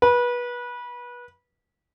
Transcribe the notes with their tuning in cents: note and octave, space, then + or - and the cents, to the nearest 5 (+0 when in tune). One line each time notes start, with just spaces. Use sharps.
B4 -25